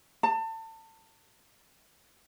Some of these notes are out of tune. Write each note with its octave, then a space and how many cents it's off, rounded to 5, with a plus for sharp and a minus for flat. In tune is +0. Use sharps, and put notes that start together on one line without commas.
A5 +30